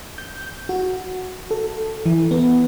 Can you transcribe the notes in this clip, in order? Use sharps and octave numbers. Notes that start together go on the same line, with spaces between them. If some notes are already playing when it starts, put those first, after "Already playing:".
G6
F#4
A4
E3
B3